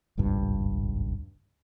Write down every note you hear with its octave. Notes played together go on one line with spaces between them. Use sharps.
D#1 G#1 C#2 G2